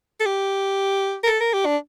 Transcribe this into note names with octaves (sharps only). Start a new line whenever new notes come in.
A4
G4
A#4
A4
A#4
G4
D4